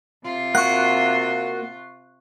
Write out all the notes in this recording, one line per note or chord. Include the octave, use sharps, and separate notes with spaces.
C3 F4
A#3 F#4 F#5 C#6 F#6